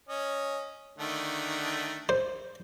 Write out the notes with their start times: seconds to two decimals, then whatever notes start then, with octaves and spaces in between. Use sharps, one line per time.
0.09 C#4 D#5
0.98 D3 D#3 A3
2.09 C5